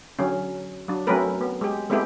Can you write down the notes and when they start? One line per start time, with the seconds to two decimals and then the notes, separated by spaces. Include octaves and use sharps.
0.19 D3 F#3 C#4
0.88 F#3 D4
1.07 F#3 A3 C4 C#4 A#4 B4
1.41 B3
1.61 G#3 G4
1.90 G#3 A3 B3 C4 E4 G4